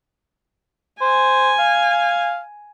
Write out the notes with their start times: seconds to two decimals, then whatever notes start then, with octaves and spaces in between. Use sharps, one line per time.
1.01 C5 G#5
1.59 F5